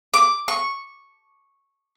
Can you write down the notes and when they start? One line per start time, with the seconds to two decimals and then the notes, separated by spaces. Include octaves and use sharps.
0.14 D6
0.48 C#6